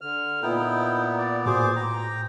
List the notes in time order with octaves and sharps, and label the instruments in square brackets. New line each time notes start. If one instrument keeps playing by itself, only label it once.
[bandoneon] D3 F6
[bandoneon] A#2 B3 [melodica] D#4 E4 G5
[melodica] D5
[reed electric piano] A2 F#4 [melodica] G#4 C5 D6
[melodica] G5 A#5